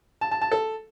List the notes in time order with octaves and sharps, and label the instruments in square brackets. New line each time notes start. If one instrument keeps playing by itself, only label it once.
[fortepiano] A5
A5
A5
A4